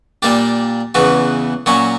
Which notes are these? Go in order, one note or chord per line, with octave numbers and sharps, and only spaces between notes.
A#2 G3 A#3 D4 G4
E2 C#3 E3 B3 F#4
A#2 F#3 C#4 F#4 C#5